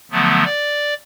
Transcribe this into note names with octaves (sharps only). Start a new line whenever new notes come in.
D3 F3 F#3 A3 B3
D5